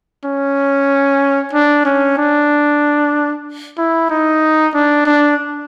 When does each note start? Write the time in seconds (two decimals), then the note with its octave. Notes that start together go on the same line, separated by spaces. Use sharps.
0.25 C#4
1.53 D4
1.85 C#4
2.18 D4
3.78 E4
4.10 D#4
4.74 D4
5.06 D4